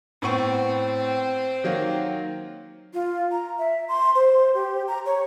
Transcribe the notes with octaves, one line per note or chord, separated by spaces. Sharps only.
A2 B3 C4 C#6
D#3 F#3 A#3
F4
A#5
E5
C6
C5
G4
A#5
C#5